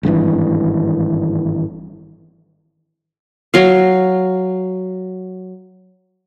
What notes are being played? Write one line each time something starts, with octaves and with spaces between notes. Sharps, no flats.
G#1 G2 C#3 E3
F#3 F5